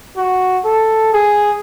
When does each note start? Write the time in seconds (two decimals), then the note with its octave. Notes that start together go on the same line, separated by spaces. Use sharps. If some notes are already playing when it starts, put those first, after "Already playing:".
0.17 F#4
0.65 A4
1.13 G#4